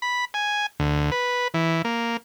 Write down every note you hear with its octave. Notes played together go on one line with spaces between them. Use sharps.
B5
G#5
D2
B4
E3
A#3